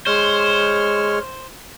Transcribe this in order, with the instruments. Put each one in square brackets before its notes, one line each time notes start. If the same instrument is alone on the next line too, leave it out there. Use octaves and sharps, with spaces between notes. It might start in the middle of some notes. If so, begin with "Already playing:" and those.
[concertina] G#3 C#5 F6 [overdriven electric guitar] C5